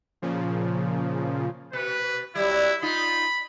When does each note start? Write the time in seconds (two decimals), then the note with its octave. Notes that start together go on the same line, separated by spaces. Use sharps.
0.22 A#2 C#3 F3
1.73 B2 B4
2.35 F#3 G3 E4
2.82 D#4 F4 B5